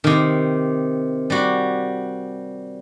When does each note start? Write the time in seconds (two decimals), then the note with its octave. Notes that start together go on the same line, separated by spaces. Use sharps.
0.04 C3 D#3
1.30 G3 F#4